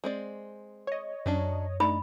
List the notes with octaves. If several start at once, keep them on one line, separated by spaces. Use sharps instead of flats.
G#3 C4 D5
C#5 D#5
F#2 F#3 C#4 D4
A3 D4 D#4 D5 B5